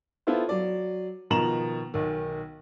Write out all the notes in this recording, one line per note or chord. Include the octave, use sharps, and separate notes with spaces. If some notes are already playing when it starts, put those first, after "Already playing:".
B3 E4 F4 A4 C5
F#3 D5
B2 D#3 F3 A#5 E7 F#7
B1 D#3